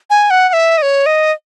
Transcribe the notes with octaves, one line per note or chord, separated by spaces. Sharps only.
G#5
F#5
F#5
E5
D#5
C#5
D#5